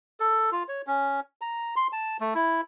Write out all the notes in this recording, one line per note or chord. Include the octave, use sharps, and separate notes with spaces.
A4
F4
C#5
C#4
A#5
C6
A5
A3
E4